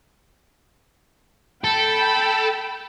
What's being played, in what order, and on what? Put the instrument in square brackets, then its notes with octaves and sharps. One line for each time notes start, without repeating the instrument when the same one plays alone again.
[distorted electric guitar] A4 [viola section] G5 B5